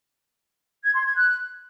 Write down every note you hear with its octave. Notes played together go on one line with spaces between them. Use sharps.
G#6
C6
G#6
F#6